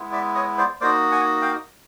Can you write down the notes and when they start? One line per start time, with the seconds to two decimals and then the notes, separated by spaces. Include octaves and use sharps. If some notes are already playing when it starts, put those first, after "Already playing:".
Already playing: G#3 B3 E4
0.12 D5 E5
0.35 C#5 D#5
0.58 C5 D5
0.81 A#3 D#4 F#4 C5 D5
1.11 F#5 G#5
1.42 F5 G5